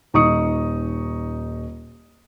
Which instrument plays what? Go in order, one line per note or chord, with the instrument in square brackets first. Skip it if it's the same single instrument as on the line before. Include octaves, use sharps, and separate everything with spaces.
[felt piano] D#1 D#4 C#6 D#6 C#7